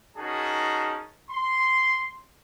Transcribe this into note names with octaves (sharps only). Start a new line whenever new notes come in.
C#4 D#4 F#4 G#4 A#4 A5
C6